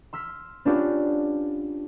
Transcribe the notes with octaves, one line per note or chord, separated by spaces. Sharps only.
C6 E6 F6 B6
B3 C#4 D4 F4 G4